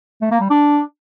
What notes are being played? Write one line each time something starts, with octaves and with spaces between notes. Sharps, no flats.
A3
A#3
G3
D4